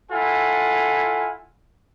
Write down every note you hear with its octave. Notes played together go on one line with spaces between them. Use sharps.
E4 F4 A4 F#5 G#5